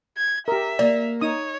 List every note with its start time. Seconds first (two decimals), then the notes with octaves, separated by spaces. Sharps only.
0.17 G#6
0.48 G4 A#4 E5
0.79 A#3 D5
1.21 D#4 C#5 D#6